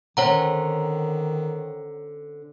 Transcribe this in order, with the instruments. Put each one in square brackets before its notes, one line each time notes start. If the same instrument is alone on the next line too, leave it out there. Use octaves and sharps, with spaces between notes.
[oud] D3 C4 C#4 [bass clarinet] D#3 [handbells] C#5 F#5 A#5